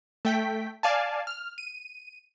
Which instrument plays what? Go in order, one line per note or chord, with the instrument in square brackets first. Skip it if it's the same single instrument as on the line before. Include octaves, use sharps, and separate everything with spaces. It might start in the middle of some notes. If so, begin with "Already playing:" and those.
[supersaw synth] A3 G5 B6
D5 F5 G#5 A5
F6
D#7